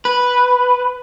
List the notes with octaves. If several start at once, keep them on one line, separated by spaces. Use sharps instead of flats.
B4